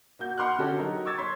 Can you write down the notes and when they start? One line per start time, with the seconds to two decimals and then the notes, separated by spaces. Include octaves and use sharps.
0.19 A#3 F#4 G6
0.38 F#5 B5 C6 D6 F6 F#6
0.59 D3 C#4 F#4 G4 A4
0.78 F#3 D#4 A#4
1.05 C#6 D6 E6 G#6 A6
1.18 C#5 C6 B6